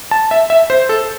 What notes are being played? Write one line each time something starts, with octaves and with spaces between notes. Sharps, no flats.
A5
E5
E5
C5
A4